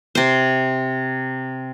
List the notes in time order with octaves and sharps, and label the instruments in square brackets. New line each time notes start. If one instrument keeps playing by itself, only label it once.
[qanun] C3 C5